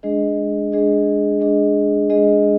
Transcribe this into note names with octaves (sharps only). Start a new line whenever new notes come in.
G#3 D4 G#4 D#5
G#3 D4 G#4 D#5
G#3 D4 G#4 D#5
G#3 D4 G#4 D#5